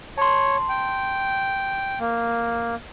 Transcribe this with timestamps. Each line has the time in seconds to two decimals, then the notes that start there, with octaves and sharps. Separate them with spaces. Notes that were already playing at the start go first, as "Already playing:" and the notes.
0.18 C#5 A5 C6
0.69 G5
2.00 A#3